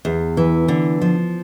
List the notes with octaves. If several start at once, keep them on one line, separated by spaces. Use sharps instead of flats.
E2
E3
D3
F3